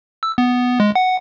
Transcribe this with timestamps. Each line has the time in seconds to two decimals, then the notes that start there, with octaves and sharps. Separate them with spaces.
0.23 E6
0.38 B3
0.80 G#3
0.95 F#5